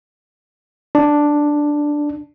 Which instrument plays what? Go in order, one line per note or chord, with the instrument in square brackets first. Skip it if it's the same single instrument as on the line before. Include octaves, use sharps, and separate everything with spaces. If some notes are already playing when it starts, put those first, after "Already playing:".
[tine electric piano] D4